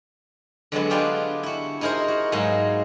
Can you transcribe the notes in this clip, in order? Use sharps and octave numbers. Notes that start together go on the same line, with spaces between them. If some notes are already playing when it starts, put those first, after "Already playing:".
D3 F#3 G#3 B3
D4 F4 G4 G#4 B4 D5
E4 F#4
D#4 E4 G#4 A#4 C5
F#4
G#2 F#3 A#3 D#4 G#4